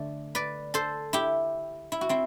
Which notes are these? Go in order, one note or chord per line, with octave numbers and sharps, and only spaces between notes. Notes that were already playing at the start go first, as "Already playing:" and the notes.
Already playing: D3 A3
B4 D5
A4 C5
E4 G4
E4
F#4
C4 E4